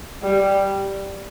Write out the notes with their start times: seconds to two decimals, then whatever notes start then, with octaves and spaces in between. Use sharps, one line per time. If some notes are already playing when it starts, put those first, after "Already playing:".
0.22 G3